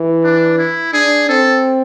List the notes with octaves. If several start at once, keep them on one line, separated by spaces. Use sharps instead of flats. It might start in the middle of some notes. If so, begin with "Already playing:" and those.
Already playing: E3
D4
E4
D4 G#4
C4 A4